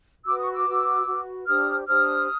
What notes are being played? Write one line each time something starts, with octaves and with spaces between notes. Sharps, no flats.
F#4 B4 D6 E6
C#6 D#6
D6 E6
F#4 B4
F#4 B4
D4 G4 C5 D#6 F6
D4 G4 C5 D#6 F6